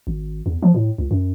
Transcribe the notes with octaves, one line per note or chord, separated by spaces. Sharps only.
G#1
E2
F3
A2
C#2
F#2